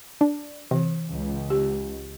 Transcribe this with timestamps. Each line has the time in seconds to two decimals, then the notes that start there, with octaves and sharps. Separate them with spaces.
0.21 D4
0.71 C3 E3
1.09 C#2
1.50 G4